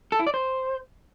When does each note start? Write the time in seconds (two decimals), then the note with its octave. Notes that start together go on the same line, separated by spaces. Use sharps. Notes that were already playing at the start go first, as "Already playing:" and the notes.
0.12 A4
0.19 E4
0.27 D5
0.34 C5